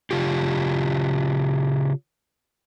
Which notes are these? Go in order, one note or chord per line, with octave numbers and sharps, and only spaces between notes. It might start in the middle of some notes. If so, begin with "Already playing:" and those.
C#3 F4 G4